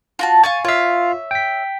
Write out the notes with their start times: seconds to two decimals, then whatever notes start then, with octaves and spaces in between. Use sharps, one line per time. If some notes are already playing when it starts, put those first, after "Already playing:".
0.19 F4 F#4 A5
0.44 F5 G#5 C#6 A6
0.65 F4 C#5 E5 F5
1.31 G5 B6